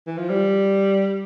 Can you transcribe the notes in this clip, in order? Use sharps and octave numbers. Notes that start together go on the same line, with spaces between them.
E3
F3
G3